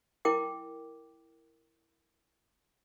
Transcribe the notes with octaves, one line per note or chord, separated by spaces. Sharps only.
E4 A#4 G5 D6